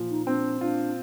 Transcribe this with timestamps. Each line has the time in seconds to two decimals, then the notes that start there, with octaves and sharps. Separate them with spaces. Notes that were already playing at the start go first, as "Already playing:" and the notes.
Already playing: A#2 F3
0.10 D#4
0.26 C4 D4
0.61 D4 F4